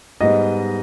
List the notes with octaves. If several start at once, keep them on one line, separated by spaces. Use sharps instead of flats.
G#2 G3 B3 D#5